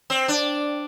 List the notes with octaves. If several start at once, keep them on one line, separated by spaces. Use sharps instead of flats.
C4
D4